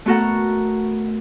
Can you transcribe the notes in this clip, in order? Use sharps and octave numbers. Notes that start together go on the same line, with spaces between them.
A3 B3 F#4 A4 A#4 F#5